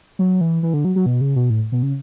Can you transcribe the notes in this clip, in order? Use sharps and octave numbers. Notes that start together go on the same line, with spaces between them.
F#3
E3
E3
D3
F#3
F#3
B2
C#3
B2
A2
B2
C#3